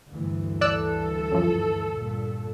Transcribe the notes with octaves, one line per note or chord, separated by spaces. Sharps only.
D2 G2 E3
A4 D5 E6 F#6
F#2 F3
G2 A#2